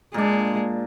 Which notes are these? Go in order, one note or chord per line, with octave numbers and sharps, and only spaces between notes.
A#2 G#3 D4